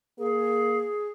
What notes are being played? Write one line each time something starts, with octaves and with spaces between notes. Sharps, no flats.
A#3 G#4